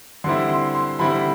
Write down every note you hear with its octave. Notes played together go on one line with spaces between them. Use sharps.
D3 G3 C4 E4 C6
C6
C6
D3 G3 C4 E4 B5